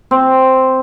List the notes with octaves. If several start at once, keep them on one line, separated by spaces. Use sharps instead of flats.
C4